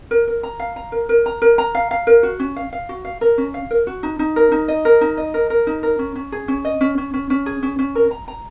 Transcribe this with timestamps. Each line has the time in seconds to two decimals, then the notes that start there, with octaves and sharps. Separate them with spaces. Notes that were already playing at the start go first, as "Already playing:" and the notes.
0.11 A#4
0.28 A#4
0.43 A#5
0.60 F5
0.76 A#5
0.92 A#4
1.09 A#4
1.26 A#5
1.42 A#4
1.58 A#5
1.75 F5
1.91 F5
2.07 A#4
2.23 F#4
2.39 C#4
2.56 F5
2.73 F5
2.89 F#4
3.05 F5
3.21 A#4
3.38 C#4
3.54 F5
3.71 A#4
3.87 F#4
4.03 D#4
4.19 D#4
4.36 A#4
4.52 D#4
4.68 D#5
4.85 A#4
5.01 D#4
5.17 D#5
5.34 A#4
5.50 A#4
5.67 D#4
5.83 A#4
5.99 C#4
6.15 C#4
6.32 G#4
6.48 C#4
6.64 D#5
6.81 C#4
6.98 C#4
7.14 C#4
7.30 C#4
7.46 G#4
7.63 C#4
7.79 C#4
7.95 A#4
8.11 A#5
8.28 A#5